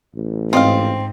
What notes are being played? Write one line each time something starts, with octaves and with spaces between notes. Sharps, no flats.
A1
G#2 C4 F4 D#5 F5